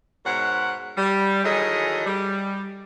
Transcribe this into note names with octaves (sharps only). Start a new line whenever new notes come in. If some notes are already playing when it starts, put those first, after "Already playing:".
G#2 B2 A#4 C#5 F#5
G3
D#3 E3 F#3 G#4 A4 D#5
G3